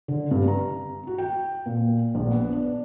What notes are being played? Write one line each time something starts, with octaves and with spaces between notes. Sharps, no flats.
D3
G2
A#5
F#4
G5
A#2
A#1
B3
D4